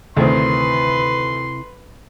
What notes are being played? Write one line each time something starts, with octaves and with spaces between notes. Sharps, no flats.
D2 C3 D#3 C4 E4 B4 C6